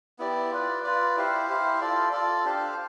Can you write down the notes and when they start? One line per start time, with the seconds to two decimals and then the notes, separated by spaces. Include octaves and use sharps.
0.19 B3 E4 G4 D5
0.51 F4 B4 D5
0.83 F4 B4 D5
1.17 E4 G4 C5 F5
1.48 E4 G4 C5 F5
1.81 F4 A4 D5
2.13 F4 A4 D5
2.45 D4 G4 C5 F5